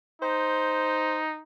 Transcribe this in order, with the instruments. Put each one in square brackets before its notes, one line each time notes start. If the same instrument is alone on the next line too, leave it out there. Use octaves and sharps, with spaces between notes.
[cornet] D#4 [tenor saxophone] C5